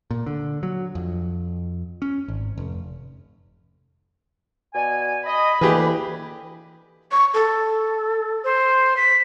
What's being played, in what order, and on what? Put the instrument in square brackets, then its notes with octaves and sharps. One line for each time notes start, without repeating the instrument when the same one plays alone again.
[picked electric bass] A#2
D3
F#3
F2
C#4
G#1
F1
[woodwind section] B2 D5 G#5
[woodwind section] D#5 [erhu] B5
[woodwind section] D2 A#3 [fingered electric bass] E3 [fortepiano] G4 G#4 B4
[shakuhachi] C#6
A4
[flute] C5
B6